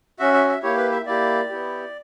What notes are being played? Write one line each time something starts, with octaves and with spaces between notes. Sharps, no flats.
C#4 F#4 E5
E5
E5
A#3 E4 G4 C#5
B4
E5
A#3 E4 G4 D5
B3 E4 G4